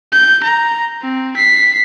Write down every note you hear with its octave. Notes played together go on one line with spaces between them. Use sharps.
G6
A#5
C4
B6 C7